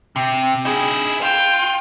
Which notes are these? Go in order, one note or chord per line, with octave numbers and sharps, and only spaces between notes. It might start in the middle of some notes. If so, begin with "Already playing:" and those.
C3
D#4 E4 G#4
F4 G5